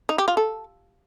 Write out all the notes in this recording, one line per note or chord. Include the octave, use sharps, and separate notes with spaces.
D#4
G4
F4
A4